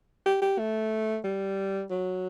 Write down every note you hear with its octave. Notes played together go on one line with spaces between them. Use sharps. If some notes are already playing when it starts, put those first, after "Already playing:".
G4
G4
A3
G3
F#3